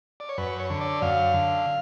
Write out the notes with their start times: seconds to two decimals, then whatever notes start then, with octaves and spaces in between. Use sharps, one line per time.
0.20 D5
0.29 C#5
0.38 F#2 B4
0.60 C#5
0.70 D3
0.81 D5
1.02 F#2 F5
1.34 D3